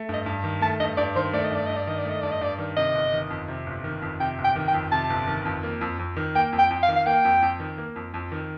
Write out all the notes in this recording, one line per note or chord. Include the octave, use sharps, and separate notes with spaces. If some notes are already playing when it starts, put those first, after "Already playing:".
Already playing: A3
G2 D#5
G2
D#3
A3 A5
G2 D#5
G2 D5
D#3 C5
A3 D5
D#5
G2 D5
G2 D#5
D5
D#3 D#5
D5
A3 D#5
G2 D5
D#5
G2 D5
D#3
C3 D#5
G1
D#3
F2
C3
G1
D#3
F2
C3 G5
G1
G5
D#3
G5
F2
C3 A5
G1
D#3
F2
A#3
F2
F2
D#3
A#3 G5
F2
G5
F2
F5
D#3
F5
A#3 G5
F2
F2
D#3
A#3
F2
F2
D#3